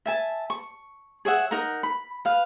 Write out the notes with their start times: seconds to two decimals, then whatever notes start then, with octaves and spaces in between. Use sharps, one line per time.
0.06 E5 G#5 A5
0.50 C#6
1.25 G#4 C#5 E5 F#5
1.51 D#4 A#4 F#5 A#5
1.83 B5
2.25 B4 F5